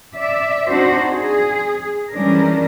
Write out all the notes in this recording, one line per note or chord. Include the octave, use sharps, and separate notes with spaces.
D5 E5
C4 D4 D#4 F#4 C5
G#4
E3 G3 G#3 C#4 D4 A#4